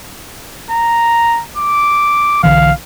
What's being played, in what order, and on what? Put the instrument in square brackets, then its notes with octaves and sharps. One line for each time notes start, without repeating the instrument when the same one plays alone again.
[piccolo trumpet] A#5
D6
[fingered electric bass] B1 D3 E3 [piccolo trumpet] F5